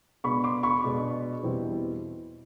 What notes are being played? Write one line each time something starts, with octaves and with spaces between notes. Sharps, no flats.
B2 G#3 B3 D4 B5 C#6
C6 D6
B5 C#6
B2 G#3 B3 D4
E2 B2 G3 C4 E4